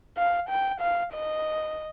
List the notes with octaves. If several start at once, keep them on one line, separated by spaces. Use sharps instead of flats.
F5
G5
F5
D#5